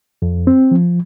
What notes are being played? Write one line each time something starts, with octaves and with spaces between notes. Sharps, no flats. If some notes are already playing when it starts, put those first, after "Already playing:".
F2
C4
F3